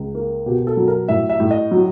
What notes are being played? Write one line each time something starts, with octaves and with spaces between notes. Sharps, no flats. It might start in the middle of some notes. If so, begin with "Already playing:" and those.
Already playing: C#2
A#3
B2 G4
A4
F#3
A#4
A2 E5
E5
A2
D#5
F#3